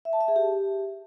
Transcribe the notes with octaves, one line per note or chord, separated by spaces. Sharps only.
E5
A5
E5
G#4
G4